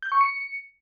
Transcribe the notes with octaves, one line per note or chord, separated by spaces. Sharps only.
G6
C#6
C#7